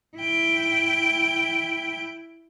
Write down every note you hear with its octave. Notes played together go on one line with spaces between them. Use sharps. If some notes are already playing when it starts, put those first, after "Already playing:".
E4 G5